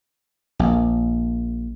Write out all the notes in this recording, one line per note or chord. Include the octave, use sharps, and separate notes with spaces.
A#1